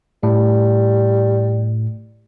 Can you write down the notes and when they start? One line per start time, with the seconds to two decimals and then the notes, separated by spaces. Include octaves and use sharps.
0.23 A2 G3